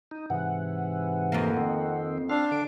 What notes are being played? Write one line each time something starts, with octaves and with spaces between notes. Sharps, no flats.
D#4
G#2 C3 E3 F#5
F2 A#3
D#3 C4
C4 D4 F5
D3 D7